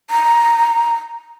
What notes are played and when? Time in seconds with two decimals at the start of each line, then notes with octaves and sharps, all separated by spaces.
0.10 A#5